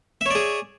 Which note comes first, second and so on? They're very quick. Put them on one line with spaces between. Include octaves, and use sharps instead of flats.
E5 C#5 D5 G#4